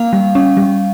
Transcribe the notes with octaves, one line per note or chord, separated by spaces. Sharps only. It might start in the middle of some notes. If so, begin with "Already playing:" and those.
Already playing: A#3 F5
G3
C#4
G3